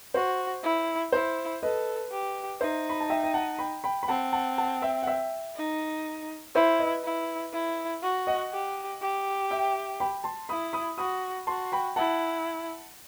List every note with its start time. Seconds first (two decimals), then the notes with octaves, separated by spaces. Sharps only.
0.14 F#4 C5
0.63 E4
1.12 E4 C5
1.62 A4 B4 D#5
2.12 G4
2.60 D#4 C5 E5
2.90 B5
3.01 A5
3.09 E5 G5
3.23 G5
3.34 F#5 A5
3.59 G5 B5
3.84 G5 B5
4.03 B5
4.08 C4 F#5 A5
4.33 F#5 A5
4.58 F#5 A5
4.82 E5 G5
5.03 F#5
5.07 E5 G5
5.56 D#4
6.55 E4 C5 E5
6.79 B4 D#5
7.04 E4
7.53 E4
8.02 F#4
8.27 D#5 F#5
8.52 G4
9.01 G4
9.51 E5 G5
10.00 G5 B5
10.24 A5 C6
10.49 E4 B5 D#6
10.73 B5 D#6
10.98 F#4 B5 D#6
11.47 F#4 A5 C6
11.72 G5 B5
11.96 E4 F#5 A5